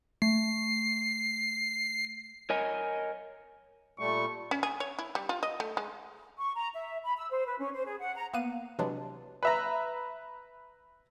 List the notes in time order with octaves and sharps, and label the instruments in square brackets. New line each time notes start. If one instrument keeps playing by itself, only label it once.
[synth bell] A3 [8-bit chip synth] C7
[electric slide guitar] A#4 C#5 D#5 G#5
[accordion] A#2 G3 A3 [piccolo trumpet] C#6
[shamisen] C#4
G#4
C#5
E4
G3
F4
D#5
A3
G#3
[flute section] C#6
A#5
E5
B5
E6
C5
B4
C#4
C5
G#4
F#5
A#5
[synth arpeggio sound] A#3 B3 F5 F#6 D#7
C3 E3 F#3 G#3 D4
[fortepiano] B4 E5 A#5